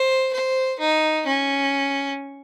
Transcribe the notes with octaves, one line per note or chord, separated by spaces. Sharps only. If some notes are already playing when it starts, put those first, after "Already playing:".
Already playing: C5
C5
D#4
C#4